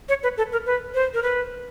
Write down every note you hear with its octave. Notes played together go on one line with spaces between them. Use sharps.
C#5
B4
A4
A#4
B4
C5
A#4
B4